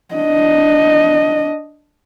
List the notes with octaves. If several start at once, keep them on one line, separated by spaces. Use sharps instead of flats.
D4 D#5